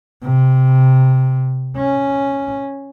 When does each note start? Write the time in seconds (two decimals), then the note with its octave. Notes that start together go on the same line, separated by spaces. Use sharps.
0.23 C3
1.77 C#4